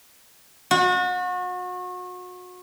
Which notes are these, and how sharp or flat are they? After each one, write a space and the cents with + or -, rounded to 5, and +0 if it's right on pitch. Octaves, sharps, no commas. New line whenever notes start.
F#4 -35